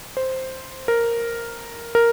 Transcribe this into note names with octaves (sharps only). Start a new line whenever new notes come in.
C5
A#4
A#4